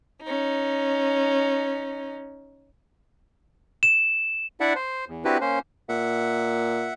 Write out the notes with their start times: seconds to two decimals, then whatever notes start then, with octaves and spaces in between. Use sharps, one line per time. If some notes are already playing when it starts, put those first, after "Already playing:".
0.23 C#4 D#4
3.83 E7
4.60 D4 E4 D5 E5 F#5
4.75 C5
5.08 E2
5.25 C4 D4 E4 F#4 G4 B4
5.41 A#3 C#4 C5
5.89 A#2 E5 F#5